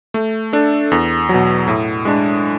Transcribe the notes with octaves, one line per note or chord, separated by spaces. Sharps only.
A3
D4 A4
E2
B2 F#3
A2
G#3 D4